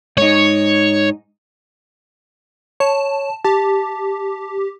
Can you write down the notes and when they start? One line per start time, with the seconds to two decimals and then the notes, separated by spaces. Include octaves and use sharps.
0.18 G#2 D#4 C#5
2.80 C#5 A5
3.45 G4 A5